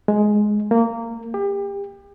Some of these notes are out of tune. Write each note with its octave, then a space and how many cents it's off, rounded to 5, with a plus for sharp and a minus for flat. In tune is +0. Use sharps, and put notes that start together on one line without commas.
G#3 +10
A#3 -20
G4 +30